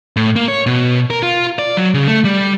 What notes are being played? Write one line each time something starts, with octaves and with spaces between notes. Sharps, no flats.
A2
A#3
C#5
B2
A#4
F4
D5
F#3
C#3
A3
G3